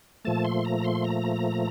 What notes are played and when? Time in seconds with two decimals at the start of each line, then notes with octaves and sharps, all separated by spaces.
0.25 A#2 F3 A3 A5
0.44 C6
0.65 A#5
0.84 C6
1.04 A#5